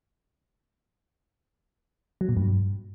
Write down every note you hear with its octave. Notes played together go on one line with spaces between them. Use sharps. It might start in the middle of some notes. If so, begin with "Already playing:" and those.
F#3
A#2
G2